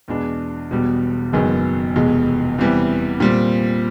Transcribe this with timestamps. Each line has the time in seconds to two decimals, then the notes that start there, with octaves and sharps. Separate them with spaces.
0.08 E2 B2 G#3 B3 D4
0.71 E1 E2 B2 G3
1.33 F#1 F#2 D#3 G#3 B3
1.96 F1 E2 B2 G#3
2.58 E2 C3 E3 G3
3.20 A#2 G3 C4